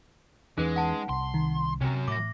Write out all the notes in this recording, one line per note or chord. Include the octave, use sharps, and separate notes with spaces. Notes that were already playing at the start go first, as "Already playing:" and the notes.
E2 E3 G#3 C#4 D#4 B4
F#5 A5
C2 C6
D#3
C3 F#3 C#4
A2 D6 A#6